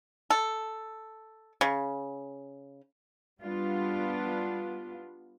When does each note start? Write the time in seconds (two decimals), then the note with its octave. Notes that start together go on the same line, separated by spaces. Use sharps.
0.30 A4
1.61 C#3
3.42 G3 B3 D4 F4